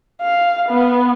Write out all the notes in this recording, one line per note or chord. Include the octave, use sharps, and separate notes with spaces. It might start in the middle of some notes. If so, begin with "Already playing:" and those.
F5
B3